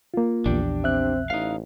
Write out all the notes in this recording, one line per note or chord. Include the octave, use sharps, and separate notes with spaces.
A#3 F4
A#1 E2 D4 G4
C4 E5 F#6
A1 D#4 F5